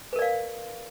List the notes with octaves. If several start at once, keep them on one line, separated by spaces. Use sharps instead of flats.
A#4 B4 D5 F5